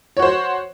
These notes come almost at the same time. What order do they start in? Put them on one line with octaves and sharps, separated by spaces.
C#5 F#4 C5